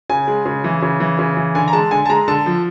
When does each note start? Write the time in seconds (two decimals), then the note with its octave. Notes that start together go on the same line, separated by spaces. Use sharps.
0.10 C#3 G#5
0.28 G#3
0.46 C#3
0.64 E3
0.82 C#3
1.00 E3
1.19 C#3
1.37 E3
1.55 D3 G#5
1.68 A#5
1.73 G#3 A5
1.91 D3 G#5
2.06 A5
2.10 G#3 A#5
2.28 D3 A5
2.46 F3